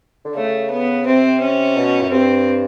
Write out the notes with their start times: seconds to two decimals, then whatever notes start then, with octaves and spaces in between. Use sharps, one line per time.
0.25 D3
0.35 C#3 A3
0.70 B3
1.06 C3 C4
1.41 C#4
1.76 B2
2.00 F#2
2.12 G2 C4